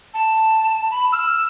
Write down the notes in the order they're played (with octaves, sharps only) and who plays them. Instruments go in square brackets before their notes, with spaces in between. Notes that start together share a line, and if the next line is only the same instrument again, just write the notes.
[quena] A5
B5
[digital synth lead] E6 [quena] F6